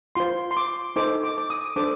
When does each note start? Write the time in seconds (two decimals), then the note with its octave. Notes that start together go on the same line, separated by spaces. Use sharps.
0.15 F4 C5 C6
0.51 C6
0.57 D6
0.96 D#4 A4 C5 D6
1.24 D6
1.38 D6
1.50 D#6
1.76 D4 A4 C5 D6